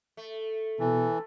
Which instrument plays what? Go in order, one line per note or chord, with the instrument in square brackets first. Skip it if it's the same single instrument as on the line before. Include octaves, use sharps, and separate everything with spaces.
[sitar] A3
[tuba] B2 [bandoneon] E3 [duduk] A4